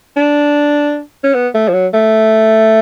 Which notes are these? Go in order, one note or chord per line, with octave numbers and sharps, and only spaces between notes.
D4
C#4
B3
A3
F3
F#3
A3